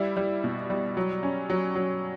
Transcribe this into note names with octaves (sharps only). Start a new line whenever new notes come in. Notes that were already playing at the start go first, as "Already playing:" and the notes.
Already playing: G3 E4
G3
B2
G3
F#3
C#4
F#3
F#3